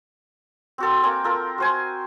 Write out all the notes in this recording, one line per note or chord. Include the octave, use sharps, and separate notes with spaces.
C4 F#4 A4
A#3 C4 G5 G#5
F4 A4 A#4
F#4 C5 G#5